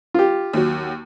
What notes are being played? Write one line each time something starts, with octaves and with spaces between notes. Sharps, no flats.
F4 G4
D#2 F#3